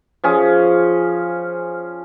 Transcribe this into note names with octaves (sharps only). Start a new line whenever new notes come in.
F3 C#4 G#4